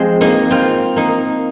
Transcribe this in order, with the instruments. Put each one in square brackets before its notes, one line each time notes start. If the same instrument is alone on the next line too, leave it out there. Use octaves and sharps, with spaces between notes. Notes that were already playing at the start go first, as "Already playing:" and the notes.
Already playing: [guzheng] F3 G#3 C4
A#3 D#4
C4 F4
A#3 D#4